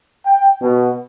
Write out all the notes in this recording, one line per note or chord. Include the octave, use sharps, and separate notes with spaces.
G5
B2